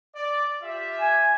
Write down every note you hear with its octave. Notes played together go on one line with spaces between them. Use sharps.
D5
F4 G4 E5
G#5